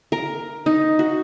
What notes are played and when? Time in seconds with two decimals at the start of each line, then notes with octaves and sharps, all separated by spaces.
0.12 A#4
0.66 D#4
0.99 F#4